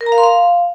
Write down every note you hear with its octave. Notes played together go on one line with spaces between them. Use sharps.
A#4
A#5
F5
C6
F5